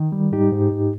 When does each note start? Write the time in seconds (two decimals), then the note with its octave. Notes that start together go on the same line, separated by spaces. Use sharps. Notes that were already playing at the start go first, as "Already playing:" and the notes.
Already playing: D#3
0.12 G3
0.32 G#2 D#4 G4
0.52 G#2
0.72 G#2